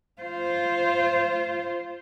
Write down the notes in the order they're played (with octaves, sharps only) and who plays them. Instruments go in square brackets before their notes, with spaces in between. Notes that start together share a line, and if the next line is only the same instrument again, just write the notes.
[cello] F4 C5